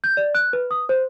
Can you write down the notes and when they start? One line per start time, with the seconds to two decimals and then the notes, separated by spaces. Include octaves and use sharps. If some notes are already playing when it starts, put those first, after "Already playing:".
0.04 G6
0.17 D5
0.35 F#6
0.53 B4
0.71 D#6
0.89 C5